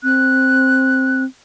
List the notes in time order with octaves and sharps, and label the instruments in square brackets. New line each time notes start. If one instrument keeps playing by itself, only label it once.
[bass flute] C4 [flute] F#6